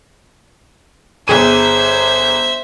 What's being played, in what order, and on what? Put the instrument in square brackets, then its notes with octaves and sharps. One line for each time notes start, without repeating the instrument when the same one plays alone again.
[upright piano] G1 G#4 D#7 [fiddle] C5 E5